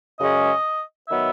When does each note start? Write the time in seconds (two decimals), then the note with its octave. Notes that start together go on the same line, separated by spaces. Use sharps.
0.20 F#2 C#3 G#3 C#4 D#5
1.09 D#3 F#3 B3 E5